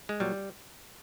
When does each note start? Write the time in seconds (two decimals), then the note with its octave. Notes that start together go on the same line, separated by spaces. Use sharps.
0.09 G#3
0.20 A#2 F#3 G3